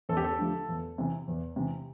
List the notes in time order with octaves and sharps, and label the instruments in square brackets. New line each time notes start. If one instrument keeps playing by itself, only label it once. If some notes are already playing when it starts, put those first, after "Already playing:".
[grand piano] E2 A4
G4
A4
D3 F3 A3
E2
C3 E3
E2
C3 E3